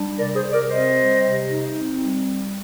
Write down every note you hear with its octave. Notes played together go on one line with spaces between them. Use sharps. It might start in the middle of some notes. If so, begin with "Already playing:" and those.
Already playing: G3 D4
C3 A#4 D5
G#4 C5
C3
A#4 D5
C4 C5 D#5
G3
C3
D#4
C4
G3